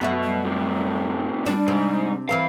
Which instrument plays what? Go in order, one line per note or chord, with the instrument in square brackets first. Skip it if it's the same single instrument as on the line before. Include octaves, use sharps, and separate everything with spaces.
[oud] F#2 A3 F#4 [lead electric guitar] B2
[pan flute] G3
[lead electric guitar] A2 C3
[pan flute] G3 [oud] D4
[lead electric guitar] G#2 [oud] C3 C4
[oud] E3 C4 A#4 [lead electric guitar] F5